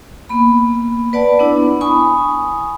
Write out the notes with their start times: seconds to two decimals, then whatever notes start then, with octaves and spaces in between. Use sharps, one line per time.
0.29 A#3 B3 B5
1.13 B4 D5 F#5 A5
1.39 B3 D4 E4
1.81 G#5 B5 C#6 D#6